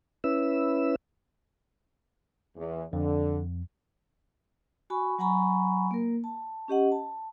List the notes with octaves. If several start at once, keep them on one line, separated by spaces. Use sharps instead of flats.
C#4 E4 B4 E6
E2
F2 D3
F#4 G#5 B5 C#6
F#3 F#5 G#5 A#5 B5 C#6
A#3 A#4
A5
C#4 G4 D#5 F#5
A5